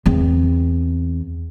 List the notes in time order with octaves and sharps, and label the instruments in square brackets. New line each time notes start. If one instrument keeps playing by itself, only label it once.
[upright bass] E2 C4